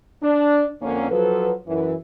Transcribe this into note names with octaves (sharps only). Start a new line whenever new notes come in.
D4
F2 D3 A#3 C#4
F3 F#3 A4 B4
F#2 E3